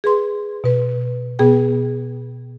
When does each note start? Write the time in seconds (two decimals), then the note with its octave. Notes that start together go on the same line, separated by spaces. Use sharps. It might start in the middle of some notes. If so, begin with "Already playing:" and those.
0.04 G#4 B4 C6
0.64 B2 B4
1.39 B2 B3 G#4 G5